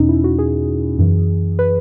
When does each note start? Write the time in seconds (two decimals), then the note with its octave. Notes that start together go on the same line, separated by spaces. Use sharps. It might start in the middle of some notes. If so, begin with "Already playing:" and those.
Already playing: E2 B2 C#4 D#4
0.09 E4
0.24 F#4
0.39 G#4
0.99 F#2 E3
1.59 B4